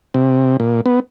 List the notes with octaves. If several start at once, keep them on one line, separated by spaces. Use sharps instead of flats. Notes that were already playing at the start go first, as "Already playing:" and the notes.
C3
A#2
B3